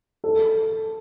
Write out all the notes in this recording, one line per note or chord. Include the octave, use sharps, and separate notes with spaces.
A4